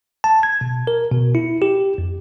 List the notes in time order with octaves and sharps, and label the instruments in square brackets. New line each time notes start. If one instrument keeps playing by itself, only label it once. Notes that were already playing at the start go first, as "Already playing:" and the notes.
[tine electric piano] A5
G#6
B2
A#4
B2
E4
G4
F2